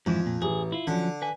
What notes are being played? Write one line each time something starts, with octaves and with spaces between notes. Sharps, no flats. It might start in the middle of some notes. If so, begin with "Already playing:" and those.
F2 G#2 E3 E4
A#2
A1 G#4
E4 F4
D3 F3 F#3 C#4
B4 G#5